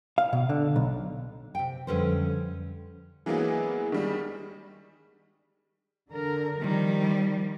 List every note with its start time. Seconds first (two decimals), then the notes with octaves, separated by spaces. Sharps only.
0.18 F5
0.33 B2
0.49 D3
0.76 B1
1.55 C3 G5
1.87 F2 D3 G3 C#4 B4 C5
3.26 E3 F#3 G#3 A#3 B3 G#4
3.92 D#3 G3 G#3
6.10 D3 A#4
6.61 D#3 F3 G3